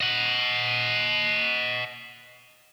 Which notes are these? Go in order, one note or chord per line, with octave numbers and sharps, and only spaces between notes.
D#5 F#5